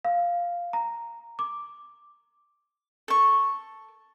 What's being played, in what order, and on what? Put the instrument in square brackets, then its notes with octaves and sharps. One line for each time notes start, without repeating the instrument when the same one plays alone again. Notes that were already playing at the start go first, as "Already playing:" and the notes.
[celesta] F5
A#5
D6
[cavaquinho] A4 C#6